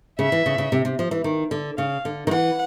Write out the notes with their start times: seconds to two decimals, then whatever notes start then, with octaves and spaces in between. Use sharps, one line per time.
0.19 C#3 E5
0.32 E3
0.46 C#3
0.58 C#3
0.72 C3
0.85 C3
0.99 F3
1.11 E3
1.24 D#3
1.51 D3
1.78 C#3 F5
2.05 D3
2.27 D#3
2.31 E3 F#5